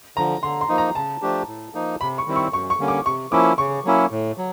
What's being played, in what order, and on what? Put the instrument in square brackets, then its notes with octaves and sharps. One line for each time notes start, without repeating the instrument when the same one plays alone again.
[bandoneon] D3 F3 [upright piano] A#5
[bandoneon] D3 [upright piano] C6
[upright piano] C6
[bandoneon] F3 A#3 D#4
[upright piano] A#5
[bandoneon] C#3 [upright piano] A5
[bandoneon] F3 A3 D4 G4
A2
F3 A#3 D#4
[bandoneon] C3 [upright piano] B5
[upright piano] C#6
[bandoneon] D#3 G3 C4 E4
[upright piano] C#6
[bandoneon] F#2 [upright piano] C#6
[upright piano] C#6
[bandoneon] D3 G3 A#3 C#4
[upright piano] D6
[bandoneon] C3 [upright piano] C#6
[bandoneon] F3 A#3 C#4 E4 [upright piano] D6
[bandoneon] C#3 [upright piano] C#6
[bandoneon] F#3 A#3 C#4 E4
A2
F#3